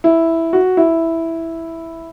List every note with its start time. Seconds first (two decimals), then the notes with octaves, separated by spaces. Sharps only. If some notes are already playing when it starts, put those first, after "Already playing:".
0.04 E4
0.53 F#4
0.77 E4